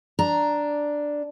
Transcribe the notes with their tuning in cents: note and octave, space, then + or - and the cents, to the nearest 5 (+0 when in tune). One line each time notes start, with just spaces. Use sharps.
D4 +0 A#5 +0